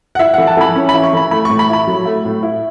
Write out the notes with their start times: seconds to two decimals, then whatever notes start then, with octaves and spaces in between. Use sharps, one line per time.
0.15 F#5
0.19 E4 E5
0.34 F#5
0.38 E3
0.47 A5
0.57 E3 B5
0.75 C#4
0.89 B5
0.94 E4
1.03 C#6
1.13 E3 B5
1.31 A3 B5
1.45 C#6
1.50 A2
1.59 B5
1.69 E4 B5
1.87 F#3
2.05 A3
2.25 A2
2.43 E4